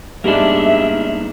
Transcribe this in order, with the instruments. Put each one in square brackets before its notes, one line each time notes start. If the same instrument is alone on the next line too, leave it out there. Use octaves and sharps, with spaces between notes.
[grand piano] G2 G3 G#3 [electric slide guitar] A#3 B3 D4 [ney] D#4 [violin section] E5